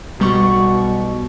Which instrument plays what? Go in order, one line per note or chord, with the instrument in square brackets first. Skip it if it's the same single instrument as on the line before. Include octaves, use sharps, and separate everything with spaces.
[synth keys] B1 G3 C#6 [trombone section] B2